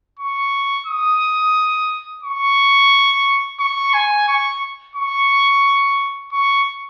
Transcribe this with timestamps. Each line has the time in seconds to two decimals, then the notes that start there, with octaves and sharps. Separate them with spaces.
0.19 C#6
0.87 D#6
2.23 C#6
3.60 C#6
3.93 G#5
4.28 C#6
4.95 C#6
6.32 C#6